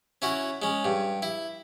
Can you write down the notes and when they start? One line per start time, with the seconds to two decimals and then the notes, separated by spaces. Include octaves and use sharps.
0.22 C#4 E4 F#4
0.62 G#3 C#4
0.85 G2
1.22 E4